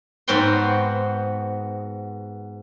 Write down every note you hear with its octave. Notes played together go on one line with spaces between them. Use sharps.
G#2 B3 C4 F#4 G5 C6